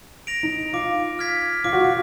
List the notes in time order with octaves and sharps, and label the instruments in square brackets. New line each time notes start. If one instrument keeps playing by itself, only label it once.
[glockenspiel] A#6 D7 F7
[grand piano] D#4
[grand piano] F4 [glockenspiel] D6
[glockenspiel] F6 G#6 B6
[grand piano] F4 [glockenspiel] D6
[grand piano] F#4
F4